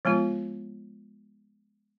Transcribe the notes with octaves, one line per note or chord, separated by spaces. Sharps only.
F3 G#3 B3 F4